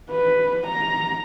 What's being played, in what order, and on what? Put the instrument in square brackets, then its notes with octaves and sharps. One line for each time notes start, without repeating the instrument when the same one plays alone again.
[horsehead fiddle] B4
A#5